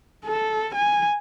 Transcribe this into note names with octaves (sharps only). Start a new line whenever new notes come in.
A4
G#5